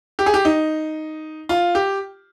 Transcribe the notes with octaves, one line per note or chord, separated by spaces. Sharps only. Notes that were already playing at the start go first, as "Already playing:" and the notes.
G4
G#4
G4
D#4
F4
G4